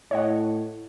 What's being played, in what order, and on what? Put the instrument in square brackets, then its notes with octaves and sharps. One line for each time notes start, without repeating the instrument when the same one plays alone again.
[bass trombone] A2 [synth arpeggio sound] C#5 D#5 F#5